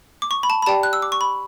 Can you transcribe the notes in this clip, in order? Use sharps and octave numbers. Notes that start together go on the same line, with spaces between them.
D6
C#6
B5
A5
B5
G4 D5 G5 A5
F#6
E6
D6
C#6
B5